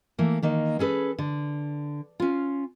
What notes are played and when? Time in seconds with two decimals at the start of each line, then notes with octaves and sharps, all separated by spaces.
0.19 E3 A3 A#3
0.43 D#3 A#3 D#4
0.79 C#4 G#4 A4 B4
1.19 D3
2.20 C#4 F4